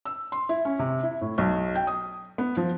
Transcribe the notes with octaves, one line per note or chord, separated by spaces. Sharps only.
E6
C6
E4
C#4
C3
E4
A2
B1
G5
D#6
B3
F3